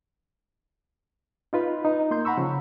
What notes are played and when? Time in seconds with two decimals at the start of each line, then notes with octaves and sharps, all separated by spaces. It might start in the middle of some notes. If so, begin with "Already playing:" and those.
1.53 D#4 F4 B4
1.85 D#4
2.11 A#3 C6 G6
2.25 F#5 A#5 B5 C#6 E6
2.38 C#3 F3